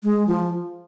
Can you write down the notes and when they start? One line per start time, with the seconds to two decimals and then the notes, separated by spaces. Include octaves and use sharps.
0.03 G#3
0.27 F3